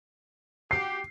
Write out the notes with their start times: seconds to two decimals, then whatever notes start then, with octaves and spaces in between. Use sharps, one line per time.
0.71 F#4 G4 C7